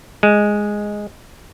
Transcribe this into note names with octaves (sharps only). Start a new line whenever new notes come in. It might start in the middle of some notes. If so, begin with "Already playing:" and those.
G#3